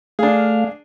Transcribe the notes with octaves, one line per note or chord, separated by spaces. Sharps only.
A3 D4 G#4 F5